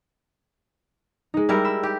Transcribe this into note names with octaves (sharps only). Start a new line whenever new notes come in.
G#3 D#4
G3 E4 A#4
B5 E6
G4